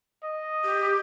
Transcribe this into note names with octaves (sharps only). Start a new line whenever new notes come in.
D#5
G4